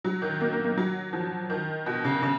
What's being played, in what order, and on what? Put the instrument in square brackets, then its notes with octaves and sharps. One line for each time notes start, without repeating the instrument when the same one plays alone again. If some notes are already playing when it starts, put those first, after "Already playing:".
[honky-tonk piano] F#3
D#3
A#3
A#3
A#3
F#3
F3
D#3
B2
C#3
C#3